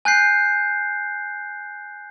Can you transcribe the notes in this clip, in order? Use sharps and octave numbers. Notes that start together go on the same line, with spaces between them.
G#5 F#6 G6 C7